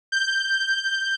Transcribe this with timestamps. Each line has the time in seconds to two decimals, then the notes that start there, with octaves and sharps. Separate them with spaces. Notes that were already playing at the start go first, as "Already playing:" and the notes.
0.12 G6